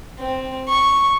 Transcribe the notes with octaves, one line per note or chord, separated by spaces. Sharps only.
C4
C#6